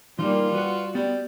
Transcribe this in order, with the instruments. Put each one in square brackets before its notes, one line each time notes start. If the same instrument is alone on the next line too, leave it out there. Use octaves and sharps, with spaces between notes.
[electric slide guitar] E3 D#4 [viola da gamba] G3 A#3 [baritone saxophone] F4
[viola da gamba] F#4 [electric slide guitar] B4 F#5
[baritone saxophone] G3 [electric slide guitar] B3